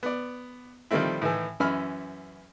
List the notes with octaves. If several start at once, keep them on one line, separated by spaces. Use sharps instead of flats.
B3 D5
D#3 F3 G3 A3 C4 E4
A2 D#3 E3
F#2 E3 C#4 E5 B5 F6